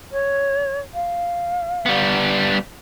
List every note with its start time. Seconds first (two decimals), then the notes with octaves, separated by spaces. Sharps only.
0.12 C#5
0.94 F5
1.86 G3 B3